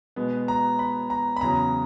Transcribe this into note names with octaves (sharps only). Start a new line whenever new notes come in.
B2 G#3 B3
A#5
B5
A#5
B5
E2 C#3 F#3 A#5